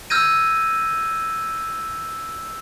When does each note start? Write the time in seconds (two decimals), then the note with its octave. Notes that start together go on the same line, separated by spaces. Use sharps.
0.10 E6 F6 G6 G#6 A#6 D#7